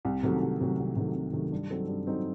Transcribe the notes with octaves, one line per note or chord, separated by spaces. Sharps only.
C2
C3 D#3 F#3 A3
C2
C3 D#3 F#3 A3
C2
C3 D#3 F#3 A3
C2
C3 D#3 F#3 A3
G2
F#3 C4 D#4 A4
G2
F#3 C4 D#4 A4